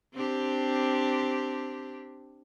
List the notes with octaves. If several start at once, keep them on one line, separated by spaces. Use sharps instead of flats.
C4 D4 G4